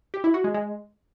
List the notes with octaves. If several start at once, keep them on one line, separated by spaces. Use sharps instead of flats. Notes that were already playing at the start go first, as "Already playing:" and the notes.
G4
E4
F#4
G#3
G#3